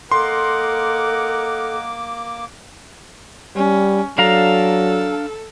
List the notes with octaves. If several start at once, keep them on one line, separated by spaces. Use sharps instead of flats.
A#3 A4 A#4 D#5 F#5 C6 D6
G3 C#4
F#3 D4 A4 F5 A#5